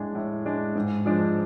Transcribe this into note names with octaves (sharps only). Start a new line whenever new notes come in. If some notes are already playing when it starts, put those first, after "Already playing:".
Already playing: A2 G#3 D4
A2
G#3 D4
G#2
F3 G#3 D4